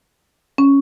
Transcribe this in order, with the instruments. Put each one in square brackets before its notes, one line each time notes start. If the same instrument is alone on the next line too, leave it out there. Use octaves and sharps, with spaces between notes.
[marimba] C#4